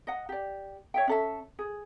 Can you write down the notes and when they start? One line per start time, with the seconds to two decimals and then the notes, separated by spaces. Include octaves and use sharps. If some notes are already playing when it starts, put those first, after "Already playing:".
0.07 D#5 F#5
0.29 G4 D5
0.94 C#5 E5 G5
1.07 C#4 A4 E5
1.59 G#4